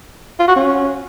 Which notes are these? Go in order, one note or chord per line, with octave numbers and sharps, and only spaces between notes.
F4
F#4
C#4